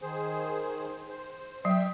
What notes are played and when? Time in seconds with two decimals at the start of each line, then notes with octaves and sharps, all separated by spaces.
0.02 D#3 G#4 C5
1.09 C5
1.65 F#3 E5 G5